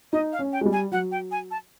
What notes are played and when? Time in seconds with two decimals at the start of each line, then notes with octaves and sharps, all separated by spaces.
0.13 D#4 D#5
0.33 F5
0.39 C#4
0.53 G5
0.61 G#3
0.65 G3
0.73 G#5
0.92 F#3 F#5
1.12 G5
1.31 G#5
1.51 A5